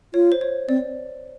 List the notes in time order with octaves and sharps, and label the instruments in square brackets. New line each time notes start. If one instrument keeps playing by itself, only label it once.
[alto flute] F4 [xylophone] C#5
[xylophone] C5
C#5
[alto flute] C4 [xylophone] D5